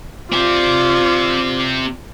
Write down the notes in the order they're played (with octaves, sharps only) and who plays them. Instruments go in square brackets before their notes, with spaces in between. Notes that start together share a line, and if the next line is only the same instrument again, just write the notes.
[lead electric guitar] C4 G4 [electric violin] F4 D5